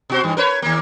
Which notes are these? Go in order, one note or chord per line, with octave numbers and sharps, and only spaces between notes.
B2 F#4 C5
G2 E3
A#4 B4 C#5
D#2 A#3